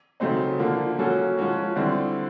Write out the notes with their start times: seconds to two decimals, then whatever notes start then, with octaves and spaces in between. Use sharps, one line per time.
0.20 C#3 F#3 A3 C4 D#4
0.59 D3 F3 A#3
0.99 F#3 A#3 C#4 F#4 A4
1.37 F3 G#3 C#4 F#4
1.76 D3 G3 C4 E4